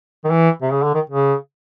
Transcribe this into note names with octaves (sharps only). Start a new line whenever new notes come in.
D#3
E3
C3
C#3
D3
D#3
C#3